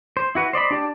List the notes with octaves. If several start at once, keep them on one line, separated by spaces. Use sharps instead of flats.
C5
E4 F#4 B4
C5 D5 D#5 B5
D4 G4 D5 A5